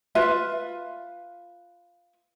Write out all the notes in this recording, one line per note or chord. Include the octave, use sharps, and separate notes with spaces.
F4 B4 E5